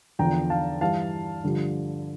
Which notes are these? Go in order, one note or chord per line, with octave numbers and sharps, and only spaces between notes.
E2 D3 F3 G5 A#5
F5 A5
G2 E3 F5 A5
G2 D3 F3